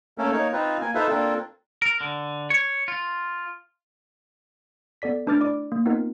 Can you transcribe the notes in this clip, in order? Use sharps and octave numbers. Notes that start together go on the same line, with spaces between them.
A3 A#3 C#4 A4
A#3 D#4 C#5
C4 D#4 F4 B4
A#3 G#5
D#4 F4 A4 B4 C5 E5
A#3 C4 D4 F4 A4
A#4
D3
C#5
F4
B3 A4 D5 B6
A3 D4 B4 D6 F6 A6
E4 D5 D6
A#3
B3 C4 D#4 F4 A#4